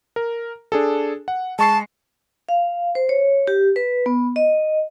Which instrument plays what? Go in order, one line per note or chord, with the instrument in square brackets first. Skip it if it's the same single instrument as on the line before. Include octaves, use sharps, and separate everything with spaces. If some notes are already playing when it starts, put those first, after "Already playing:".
[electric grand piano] A#4
D4 G#4 A4
F#5
[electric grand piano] G#3 C#6 C7 [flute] A5
[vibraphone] F5
C5
C#5
G4
B4
B3
D#5